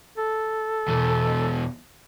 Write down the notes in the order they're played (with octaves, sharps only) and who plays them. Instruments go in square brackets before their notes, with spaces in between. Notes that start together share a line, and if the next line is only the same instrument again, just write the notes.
[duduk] A4
[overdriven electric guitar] E2 B2